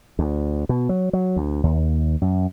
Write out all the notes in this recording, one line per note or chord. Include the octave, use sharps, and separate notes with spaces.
D2
B2
F#3
F#3
D2
D#2
F#2